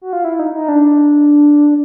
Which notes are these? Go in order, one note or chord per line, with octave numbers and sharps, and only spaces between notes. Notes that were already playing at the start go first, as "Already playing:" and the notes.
F#4
F4
E4
D#4
D#4
D4